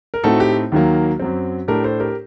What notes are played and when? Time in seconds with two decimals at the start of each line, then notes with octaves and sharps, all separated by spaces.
0.14 A#4
0.24 A2 A3 C4 D#4 F#4 A4
0.40 G4
0.72 D#2 D#3 F#3 A#3
1.20 F#2 F#3 C4
1.68 A2 A3 D4 G4 A#4
1.84 A4 C5
2.00 G4 A#4